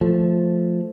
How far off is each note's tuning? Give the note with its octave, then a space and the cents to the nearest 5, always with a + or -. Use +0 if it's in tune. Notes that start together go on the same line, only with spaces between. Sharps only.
F3 +0 A3 +0